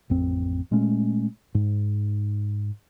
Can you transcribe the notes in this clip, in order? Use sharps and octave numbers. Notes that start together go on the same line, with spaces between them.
A1 F2 C4
A#2 G#3 A3 C#4
G#2